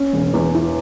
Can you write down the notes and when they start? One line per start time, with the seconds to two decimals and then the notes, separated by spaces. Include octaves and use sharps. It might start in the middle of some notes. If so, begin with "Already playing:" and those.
Already playing: C#4
0.13 E1
0.34 E2
0.54 E3